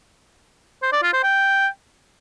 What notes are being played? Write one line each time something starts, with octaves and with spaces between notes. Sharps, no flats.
C5
D5
F4
C5
G5